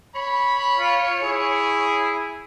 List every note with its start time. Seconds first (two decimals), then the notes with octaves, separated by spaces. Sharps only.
0.15 C#5 B5
0.79 F4
1.22 E4 G#4